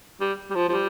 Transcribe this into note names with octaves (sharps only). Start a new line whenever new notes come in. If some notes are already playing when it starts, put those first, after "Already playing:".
G3
G3
F3
F3
G3